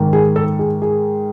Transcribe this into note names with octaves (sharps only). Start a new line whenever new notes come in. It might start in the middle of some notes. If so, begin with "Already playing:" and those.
Already playing: G#2 D#3
G#4
A4
G#4
G#4